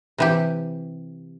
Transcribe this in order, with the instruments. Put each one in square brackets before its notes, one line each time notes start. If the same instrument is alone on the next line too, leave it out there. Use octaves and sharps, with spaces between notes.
[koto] C3 E3 G4